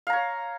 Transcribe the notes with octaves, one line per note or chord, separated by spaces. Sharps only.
C#5 F5 A#5